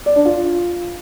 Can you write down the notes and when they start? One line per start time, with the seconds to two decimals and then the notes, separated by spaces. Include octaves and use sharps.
0.06 D5
0.16 D4
0.25 F4